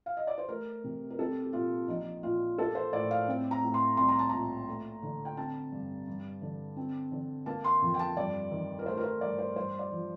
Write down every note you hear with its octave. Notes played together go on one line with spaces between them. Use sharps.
F5
D#5
D5
C5
A3 A#4
C3
A#4
C4 A4
G4
A#2 F4
A#1 D#4
A#2 F4
A#3 A4
C5
A2 D5
F5
C4
A#5
A2
C6
C2 C6
A#5
A5
A#2 A#5
A3
D3
G5
C4 A5
G2
G2
D3
C4
D3
A#3 A5
C6
F2
G5
A5
G2 D5
D#3
A#4
A3 C5
A#4
C5
G2 D5
C5
G2 C5
D5
F3